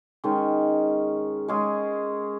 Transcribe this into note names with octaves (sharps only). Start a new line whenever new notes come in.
D#3 G#3 C#4
G#3 C#4 G#4